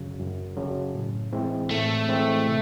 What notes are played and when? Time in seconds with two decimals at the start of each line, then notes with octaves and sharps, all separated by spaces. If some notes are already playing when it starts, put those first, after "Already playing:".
Already playing: F#2 C#3 F#3
0.19 F#2
0.57 C#3 F#3
0.94 A2
1.33 E3 G#3 C4 E4
1.71 A2 A3
2.09 E3 G#3 C4 E4
2.47 C3